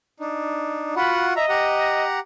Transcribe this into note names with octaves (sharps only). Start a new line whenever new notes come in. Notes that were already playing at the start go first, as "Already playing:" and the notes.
D4 D#4
F4 F#4 F#5 B5
D#5 E5 A#5
G4 F#5 A#5